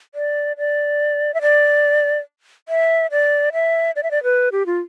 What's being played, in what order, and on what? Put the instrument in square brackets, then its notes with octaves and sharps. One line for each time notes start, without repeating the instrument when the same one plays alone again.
[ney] D5
D5
E5
D5
E5
D5
E5
D5
E5
D5
B4
G4
F4